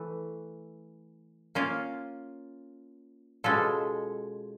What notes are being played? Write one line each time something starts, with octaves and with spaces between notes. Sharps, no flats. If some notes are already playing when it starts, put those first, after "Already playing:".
Already playing: E3 A3
A#3 C#4 F4
B2 G#3 C#4 F4 A4